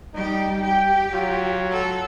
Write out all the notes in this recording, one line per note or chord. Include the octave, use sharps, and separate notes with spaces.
G3 D#4 G4
G4 G5
F#3 F4
A4